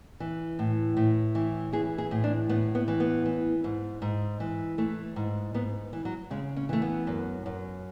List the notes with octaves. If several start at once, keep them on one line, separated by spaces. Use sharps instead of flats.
E3
A2
A2
E3
E3 G#4
G#4
A2
D4
A2 B3
B3
E3
B3
E3
G#2
G#2
E3
E3 A3
G#2
G#2 B3
E3
F#3
C#3 G#3
C#4
E3 A3
B3
F#2
F#2